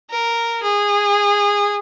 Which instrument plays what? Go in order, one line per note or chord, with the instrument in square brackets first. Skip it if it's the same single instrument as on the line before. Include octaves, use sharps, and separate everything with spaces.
[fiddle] A#4
G#4